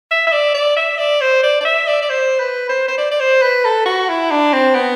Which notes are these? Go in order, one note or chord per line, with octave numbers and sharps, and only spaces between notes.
E5
E5
D5
D5
E5
D5
C5
D5
D5
E5
D5
D5
C5
B4
C5
C5
D5
D5
C5
B4
A4
F#4
E4
D4
C4
B3